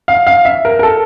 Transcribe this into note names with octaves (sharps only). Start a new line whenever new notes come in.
F5
F5
E5
A#4
A#4
A4